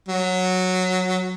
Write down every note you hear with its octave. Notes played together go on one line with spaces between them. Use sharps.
F#3